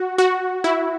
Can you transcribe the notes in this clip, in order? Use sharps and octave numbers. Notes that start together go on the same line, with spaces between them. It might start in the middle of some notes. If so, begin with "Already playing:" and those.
Already playing: F#4
F#4
E4